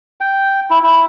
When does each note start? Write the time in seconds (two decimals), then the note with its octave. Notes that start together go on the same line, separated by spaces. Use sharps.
0.21 G5
0.70 E4
0.83 E4